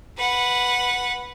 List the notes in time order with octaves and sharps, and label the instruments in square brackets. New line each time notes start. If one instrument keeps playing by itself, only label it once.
[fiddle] B4 F#5